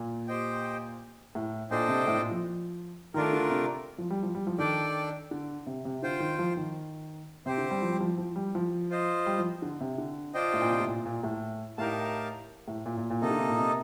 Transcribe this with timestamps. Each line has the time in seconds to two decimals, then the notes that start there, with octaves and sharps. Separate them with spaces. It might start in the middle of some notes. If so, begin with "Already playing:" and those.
Already playing: A#2
0.27 G4 C5 D#5 G5
1.35 A2
1.71 A#2 D4 A4 C5 D#5 G5
1.88 C3
2.07 A2
2.18 A#2
2.31 F3
3.14 D#3 A3 D4 F4 A#4
3.33 D3
3.50 C3
3.98 F3
4.10 G3
4.23 F3
4.35 G3
4.47 F3
4.58 D#3 D4 A4 D5 G5
5.31 D3
5.67 C3
5.85 C3
6.03 D3 F4 C5 G5
6.20 D#3
6.39 F3
6.57 D#3
7.46 C3 C4 G4 C5
7.58 D3
7.71 G3
7.82 F3
7.92 G3
8.01 F3
8.18 F3
8.36 G3
8.55 F3
8.90 F4 C5 D#5
9.26 G3
9.38 F3
9.62 D3
9.81 C3
9.98 D3
10.34 D4 F4 C5 D#5 G5
10.53 A2
10.62 A#2
10.71 C3
10.80 A2
10.88 A#2
11.06 A#2
11.23 A2
11.78 A2 D#4 G4 A#4 F5 A5
12.68 A2
12.86 A#2
12.97 A#2
13.10 A#2
13.21 C3 A#3 D#4 A4 D#5
13.31 D3
13.40 C3
13.49 A#2
13.58 C3